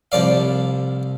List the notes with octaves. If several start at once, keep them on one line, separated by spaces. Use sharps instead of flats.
C2 F3 D5 F5